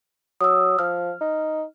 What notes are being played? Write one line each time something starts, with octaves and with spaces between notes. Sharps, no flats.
F#3 D#6 E6
F3 F6
D#4